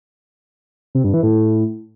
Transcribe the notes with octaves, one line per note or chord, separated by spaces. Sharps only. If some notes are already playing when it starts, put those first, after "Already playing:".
C3
G2
E3
A2